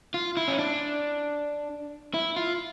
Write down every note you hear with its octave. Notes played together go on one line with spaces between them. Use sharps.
F4
E4
C#4
D4
E4
F4